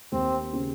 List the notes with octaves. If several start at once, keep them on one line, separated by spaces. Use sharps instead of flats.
D#2 C4
C#3